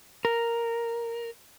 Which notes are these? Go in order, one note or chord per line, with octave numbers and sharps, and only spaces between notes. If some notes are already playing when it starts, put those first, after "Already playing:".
A#4